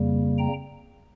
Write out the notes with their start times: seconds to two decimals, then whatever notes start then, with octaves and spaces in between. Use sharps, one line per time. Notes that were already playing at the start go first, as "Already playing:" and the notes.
Already playing: F2 C#3 G3 A#3
0.38 G5 A#5